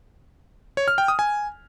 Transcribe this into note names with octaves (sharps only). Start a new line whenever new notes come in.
C#5
F6
G5
D#6
G#5